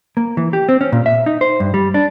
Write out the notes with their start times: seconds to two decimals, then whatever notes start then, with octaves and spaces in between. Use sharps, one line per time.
0.17 A#3
0.37 E3
0.53 G4
0.69 C4
0.81 C#4
0.92 A#2
1.06 E5
1.26 D#4
1.41 C5
1.60 G2
1.74 G3
1.94 D4